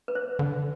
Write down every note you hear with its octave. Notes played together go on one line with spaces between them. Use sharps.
B4
C5
D3